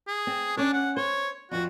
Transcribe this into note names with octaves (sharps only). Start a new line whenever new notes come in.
G#4
C4
C#4 D4 C#5
F#5
C5 C#5
F2 F3 F#4